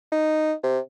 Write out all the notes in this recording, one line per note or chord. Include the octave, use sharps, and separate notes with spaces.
D#4
C3